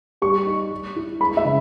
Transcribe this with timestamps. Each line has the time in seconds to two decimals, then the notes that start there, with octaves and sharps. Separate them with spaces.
0.22 G3 C#6
0.46 D#4
0.71 G3
0.96 E4
1.20 G#3 B5
1.37 E5
1.45 C#3